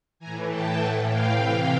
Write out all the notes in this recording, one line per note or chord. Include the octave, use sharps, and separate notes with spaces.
E3 G#5 A#5
A2
G5 A5
A2 E3 F#5 G#5
F5 G5
C3 E3